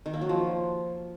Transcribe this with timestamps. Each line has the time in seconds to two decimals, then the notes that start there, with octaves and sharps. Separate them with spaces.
0.06 D#3
0.13 A#3
0.21 F#3
0.29 F3